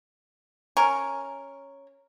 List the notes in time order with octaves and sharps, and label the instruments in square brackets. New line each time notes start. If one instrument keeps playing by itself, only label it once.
[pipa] C#4 A#4